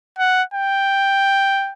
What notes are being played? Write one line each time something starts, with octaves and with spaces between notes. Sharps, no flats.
F#5
G5